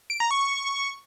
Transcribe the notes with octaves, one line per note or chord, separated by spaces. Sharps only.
D7
A#5
C#6